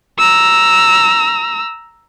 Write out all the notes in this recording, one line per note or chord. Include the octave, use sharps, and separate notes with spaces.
A#5 E6